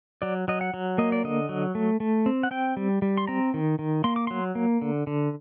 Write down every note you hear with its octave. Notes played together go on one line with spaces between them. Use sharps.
F#3 D5
F#3 D#5
F#5
F#3
A#3 D#5
D5
D3 D#5
F#3
A3
A3
C4
F#5
C4 G5
G3
G3
C6
C4 A#5
D#3
D#3
A#3 C6
D6
F#3 C6
A#3
D3
D3